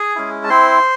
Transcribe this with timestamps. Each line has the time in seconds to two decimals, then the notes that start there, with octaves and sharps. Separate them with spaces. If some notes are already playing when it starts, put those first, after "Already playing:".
Already playing: G#4 G#5
0.16 G#3 C#4 E4
0.44 A5
0.49 C4 E4 C5 C6